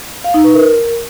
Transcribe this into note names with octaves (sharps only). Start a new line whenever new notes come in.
F5
D#4
B4
A#4